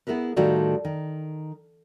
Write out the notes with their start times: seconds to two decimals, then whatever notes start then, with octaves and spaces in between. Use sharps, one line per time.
0.07 B3 E4 G#4 A#4 B4
0.36 A2 D#3 G3 F4 F#4 A4
0.85 D#3